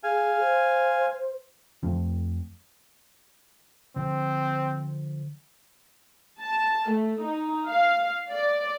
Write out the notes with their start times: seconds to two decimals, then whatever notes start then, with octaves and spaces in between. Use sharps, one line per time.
0.03 G#4 F5 G#5
0.40 C5
1.83 F2 F3 A3 C4
3.96 D3 F3 C4
6.40 A5
6.91 A3
7.23 D#4
7.67 F5
8.30 D5